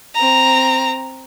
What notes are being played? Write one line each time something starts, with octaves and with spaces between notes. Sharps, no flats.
C4 A#5